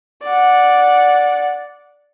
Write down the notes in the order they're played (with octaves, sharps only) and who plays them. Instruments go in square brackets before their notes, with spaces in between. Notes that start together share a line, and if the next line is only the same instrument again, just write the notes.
[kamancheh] D5 F#5